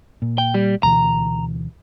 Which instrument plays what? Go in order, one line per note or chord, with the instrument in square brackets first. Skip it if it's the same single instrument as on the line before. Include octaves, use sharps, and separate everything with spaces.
[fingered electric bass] A#2
[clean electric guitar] G5
G3
[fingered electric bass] D2 B2 E3 [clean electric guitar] A#5